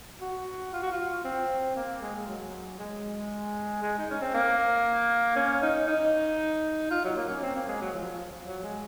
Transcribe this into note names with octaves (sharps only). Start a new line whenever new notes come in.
F#4
F4
F#4
F4
C4
A#3
G#3
G#3
F#3
G#3
G#3
D#4
C#4
C4
A#3
C#4
D#4
D#4
F4
F#3
A#3
C#4
C4
A#3
G#3
F#3
F3
F#3
G#3